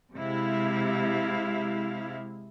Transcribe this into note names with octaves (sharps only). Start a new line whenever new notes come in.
C3 G#3 E4 F5